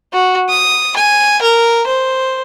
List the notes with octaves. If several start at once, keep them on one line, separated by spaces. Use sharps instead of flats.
F#4
D#6
G#5
A#4
C5